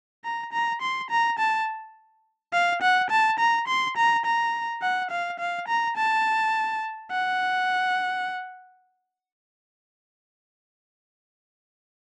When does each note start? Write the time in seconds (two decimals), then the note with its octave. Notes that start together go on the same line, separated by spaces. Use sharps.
0.24 A#5
0.52 A#5
0.81 C6
1.10 A#5
1.38 A5
2.53 F5
2.82 F#5
3.10 A5
3.39 A#5
3.68 C6
3.96 A#5
4.25 A#5
4.82 F#5
5.11 F5
5.39 F5
5.68 A#5
5.97 A5
7.11 F#5